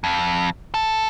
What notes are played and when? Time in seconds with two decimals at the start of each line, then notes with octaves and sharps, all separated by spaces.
0.04 F2
0.74 A4